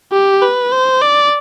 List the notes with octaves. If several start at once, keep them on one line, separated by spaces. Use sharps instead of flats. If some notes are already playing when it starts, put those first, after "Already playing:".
G4
B4
C5
D5